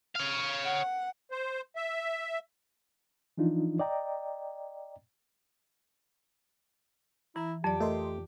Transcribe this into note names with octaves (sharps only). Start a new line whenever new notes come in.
C#5 F5
F#5
C5
E5
E3 F3 D4 D#4 F4
D5 D#5 G5 A#5
E3 E4 A#5
F2 F#3 G4 D5
A3 A#4 D#5 C6